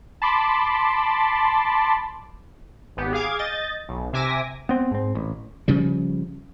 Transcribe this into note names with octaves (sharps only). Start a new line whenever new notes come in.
A5 B5 C6 D6
G#1 B3 G4
G#4 F5 D6 G#6
D#5 G6 A6
B1
C3 E5 G#5 D6 A#6
B3 C4
G#2 C4
A1
C#3 F3 G3